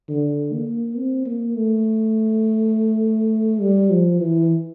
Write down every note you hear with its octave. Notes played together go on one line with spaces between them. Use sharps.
D3
A#3
C4
A#3
A3
G3
F3
E3